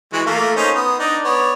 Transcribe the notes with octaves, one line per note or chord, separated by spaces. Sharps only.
E3 G#3 F#4
A3 A#3 F4
C#4 D#4 C5
B3 D#6
D4 D#4
B3 C#5 D5